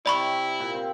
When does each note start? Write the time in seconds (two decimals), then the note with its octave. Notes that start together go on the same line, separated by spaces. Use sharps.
0.06 C3 E4 D5 B5 C#6
0.60 A#2
0.74 C4